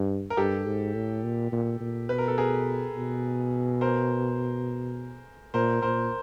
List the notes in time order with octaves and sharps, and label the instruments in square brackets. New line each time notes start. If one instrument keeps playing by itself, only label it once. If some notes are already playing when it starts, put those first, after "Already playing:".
Already playing: [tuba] G2
[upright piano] A#4
[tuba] G2 [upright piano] G4 A4
[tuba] G#2
A2
A#2
A#2
A#2
[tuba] B2 [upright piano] B4
[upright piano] A#4
A4
G#4 A#4
[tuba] B2
[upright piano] A#4 C5
[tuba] A#2 [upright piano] A#4 C5
[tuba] A#2 [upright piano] A#4 C5